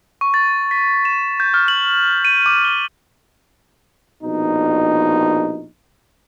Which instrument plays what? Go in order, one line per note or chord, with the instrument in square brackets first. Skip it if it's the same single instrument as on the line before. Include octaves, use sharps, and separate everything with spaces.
[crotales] C#6
A6
B6
E7
G6
F6
F#7
D#7
D6
G7
[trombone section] A#1 B2 D#4